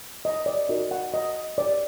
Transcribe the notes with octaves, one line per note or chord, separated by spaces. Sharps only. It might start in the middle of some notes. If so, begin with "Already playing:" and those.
D#5
D5
D#4 F#4 A#4 D#5
F#5
D#5
D5